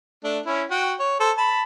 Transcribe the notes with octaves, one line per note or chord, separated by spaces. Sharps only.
A3 D4
C#4 E4
F#4 G5
C#5
A4 C5
A5 B5